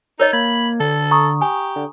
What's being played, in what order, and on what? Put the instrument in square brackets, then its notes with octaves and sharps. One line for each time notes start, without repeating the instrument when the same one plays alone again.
[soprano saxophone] D#4 [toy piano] A#4 C#5 D#5
[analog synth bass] A#3 [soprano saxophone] B5 [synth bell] G#6
[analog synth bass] D3 [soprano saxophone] A4
[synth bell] A#5 C#6 D#6
[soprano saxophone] G4 [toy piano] G#5
[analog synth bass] D3